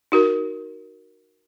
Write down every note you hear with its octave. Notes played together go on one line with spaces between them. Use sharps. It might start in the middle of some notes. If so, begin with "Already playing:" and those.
D#4 F#4 A#4